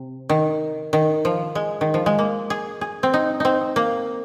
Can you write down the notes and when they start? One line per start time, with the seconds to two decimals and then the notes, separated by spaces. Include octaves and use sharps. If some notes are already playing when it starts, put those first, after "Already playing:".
Already playing: C3
0.29 D#3
0.93 D#3
1.25 F3
1.55 G#3
1.81 D#3
1.94 F3
2.06 G#3
2.19 A#3
2.50 G#4
2.81 G#4
3.03 C4
3.14 D#4
3.40 C4 D#4
3.76 A#3